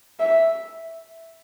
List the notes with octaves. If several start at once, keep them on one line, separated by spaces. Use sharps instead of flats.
E5